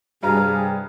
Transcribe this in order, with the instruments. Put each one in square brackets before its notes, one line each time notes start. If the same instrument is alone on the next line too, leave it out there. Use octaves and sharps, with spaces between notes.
[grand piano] G2 B4 A#5 [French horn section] C3 G3 [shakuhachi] G#4 [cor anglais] F5